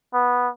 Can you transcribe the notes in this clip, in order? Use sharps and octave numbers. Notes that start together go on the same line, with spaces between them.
B3